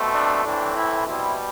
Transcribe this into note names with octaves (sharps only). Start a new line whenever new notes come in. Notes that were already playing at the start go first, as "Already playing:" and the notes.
Already playing: B2 A3 C4
D4
A2 E3 A3 C4 D4
E4
B2 G3 C4 E4